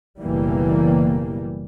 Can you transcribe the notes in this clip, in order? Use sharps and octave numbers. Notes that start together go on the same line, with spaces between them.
F#1 B1 E3 G3 A#3